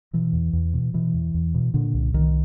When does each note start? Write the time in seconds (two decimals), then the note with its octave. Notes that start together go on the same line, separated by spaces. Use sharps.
0.13 B2 E3
0.33 E2
0.53 E2
0.74 B2
0.94 B2 E3
1.14 E2
1.34 E2
1.54 B2
1.74 A#2 D3
1.94 C2
2.14 C2 D#3